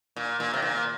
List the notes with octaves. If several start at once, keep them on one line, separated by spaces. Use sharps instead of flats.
A#2
A#2
C3
A#2